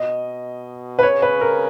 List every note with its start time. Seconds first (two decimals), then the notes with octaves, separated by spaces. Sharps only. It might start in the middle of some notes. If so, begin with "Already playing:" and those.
Already playing: B2 D#5
0.99 B4
1.03 C#3 C#5
1.22 B4
1.41 A#4